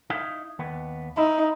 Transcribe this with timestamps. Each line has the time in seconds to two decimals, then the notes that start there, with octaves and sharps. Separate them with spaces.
0.10 D#4 E4 F5
0.59 D#2 B3
1.17 D#4 E4